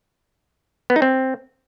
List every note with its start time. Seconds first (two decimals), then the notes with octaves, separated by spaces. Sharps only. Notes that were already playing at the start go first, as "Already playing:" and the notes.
0.90 B3
0.96 D#4
1.02 C4